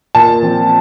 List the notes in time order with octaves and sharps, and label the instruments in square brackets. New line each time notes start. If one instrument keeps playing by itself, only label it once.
[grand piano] A#2 A5
F3 C4